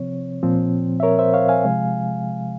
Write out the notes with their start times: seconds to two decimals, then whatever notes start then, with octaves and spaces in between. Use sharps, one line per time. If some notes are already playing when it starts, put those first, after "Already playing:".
Already playing: C3 F3 C4 C#5
0.43 A#2 F3 C4
1.00 E5
1.03 A#4 C#5
1.19 C5 E5
1.34 C#5 F5
1.49 F5 G#5
1.65 C3 F3 G#3